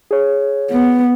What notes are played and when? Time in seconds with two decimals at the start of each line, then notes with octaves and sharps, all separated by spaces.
0.11 G#4 C#5
0.71 B3